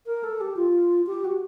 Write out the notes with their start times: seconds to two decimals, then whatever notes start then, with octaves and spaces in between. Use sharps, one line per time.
0.06 A#4
0.23 A4
0.41 G4
0.56 F4
1.06 G4
1.24 F#4